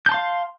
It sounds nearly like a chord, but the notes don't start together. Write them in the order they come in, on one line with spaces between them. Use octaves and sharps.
G6 A5 C6 F5